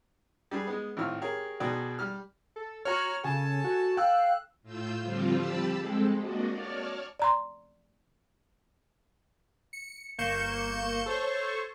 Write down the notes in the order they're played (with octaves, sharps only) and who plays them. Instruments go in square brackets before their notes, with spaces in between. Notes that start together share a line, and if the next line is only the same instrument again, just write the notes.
[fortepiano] G3 D4 G#4 B4
G#3 B3
G#1 A2 F4 E6 F6
G4 G#4 A#4 C#5
B1 B2 G#4 B4 D5 G5
G3 F6
[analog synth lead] A4
[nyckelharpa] F#4 [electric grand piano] C#5 A#5 [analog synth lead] F6
[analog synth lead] C#3 [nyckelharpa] A4 A5 [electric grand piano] G#5
[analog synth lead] F#4
[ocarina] F5 [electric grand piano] G5 E6 [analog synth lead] F#6
[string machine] A2 F4 E6 G6
D3 F3 G3 C4 F4
G4 A5 B5 E6
G#3 C4 A4
A#3 D4 F#4 D5 D#5
C#5 D5 A5 F6
[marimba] D5 A#5 C6
[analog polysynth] C#7
G1 A#3 C#6 G6 C#7 E7
A4 C5 C#5 C#6